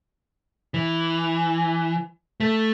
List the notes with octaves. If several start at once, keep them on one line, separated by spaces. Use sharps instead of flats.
E3
A3